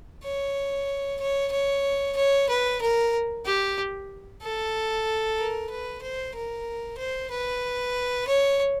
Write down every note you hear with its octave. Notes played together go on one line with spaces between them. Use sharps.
C#5
C#5
C#5
C#5
B4
A#4
G4
A4
A#4
B4
C5
A#4
C5
B4
C#5